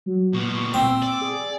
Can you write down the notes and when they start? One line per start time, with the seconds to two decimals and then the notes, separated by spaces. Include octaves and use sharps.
0.06 F#3
0.34 A#2 B3 C#6
0.74 C4 E6
1.03 D5
1.22 G#4